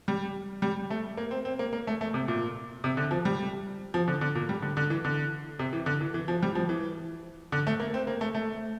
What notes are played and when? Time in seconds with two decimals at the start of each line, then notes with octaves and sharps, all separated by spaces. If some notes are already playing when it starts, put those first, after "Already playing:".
0.08 G3
0.62 G3
0.90 A3
1.17 A#3
1.31 C4
1.45 C4
1.59 A#3
1.73 A#3
1.87 A3
2.01 A3
2.14 C3
2.28 A#2
2.84 C3
2.97 D3
3.11 F3
3.25 G3
3.94 F3
4.08 D3
4.21 D3
4.35 A#2
4.49 G3
4.62 D3
4.77 D3
4.90 E3
5.05 D3
5.59 C3
5.73 E3
5.86 D3
6.01 E3
6.14 E3
6.28 F3
6.43 G3
6.55 F3
6.69 E3
7.52 D3
7.67 A3
7.80 A#3
7.94 C4
8.07 A#3
8.21 A3
8.35 A3